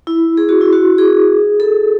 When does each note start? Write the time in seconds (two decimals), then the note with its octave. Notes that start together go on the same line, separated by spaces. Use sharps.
0.07 E4
0.37 G#4
0.49 F#4
0.61 E4
0.73 F#4
0.98 G#4
1.60 A4